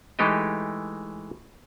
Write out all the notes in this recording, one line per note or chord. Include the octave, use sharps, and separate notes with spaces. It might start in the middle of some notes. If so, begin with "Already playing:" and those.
E3 G#3 A3 D#4 G4 D#5